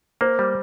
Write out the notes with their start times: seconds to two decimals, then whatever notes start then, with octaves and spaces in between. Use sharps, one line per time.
0.21 A#3 C5
0.39 G3